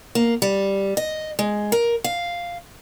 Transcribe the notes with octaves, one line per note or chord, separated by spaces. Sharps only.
A#3
G3
D#5
G#3
A#4
F5